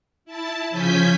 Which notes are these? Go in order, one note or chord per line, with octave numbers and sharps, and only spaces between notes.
E4 A5
C#3 F3 C#4 G#5 G6 B6